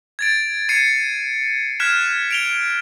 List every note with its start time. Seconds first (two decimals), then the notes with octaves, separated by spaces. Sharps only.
0.19 G#6 A6 D7
0.69 G#6 C7 C#7 D#7
1.80 F6 F#6 G#6 B6 E7
2.31 D7 F7 G7